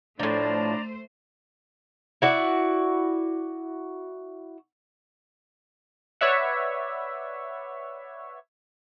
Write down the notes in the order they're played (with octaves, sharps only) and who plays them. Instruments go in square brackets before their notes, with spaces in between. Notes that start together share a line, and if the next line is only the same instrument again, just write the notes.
[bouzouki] A2 F3 [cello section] A3 C5 [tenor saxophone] D4 [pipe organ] D5 A#5
[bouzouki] E4 F#4 D5
[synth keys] B4 C#5 D5 E5 F#5